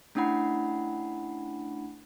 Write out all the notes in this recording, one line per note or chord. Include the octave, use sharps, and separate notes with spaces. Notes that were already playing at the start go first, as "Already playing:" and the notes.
A3 C#4 D4 E4 F#5 B5